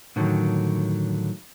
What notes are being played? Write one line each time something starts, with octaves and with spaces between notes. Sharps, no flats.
A2 D3 D#3 F3 F#3